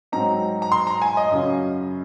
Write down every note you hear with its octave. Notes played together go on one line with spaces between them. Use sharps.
G#2 F#3 C4 D#4 A#5
A#5
C6
A#5
G#5
D#5
F#2 C#3 F#3 C#4 F4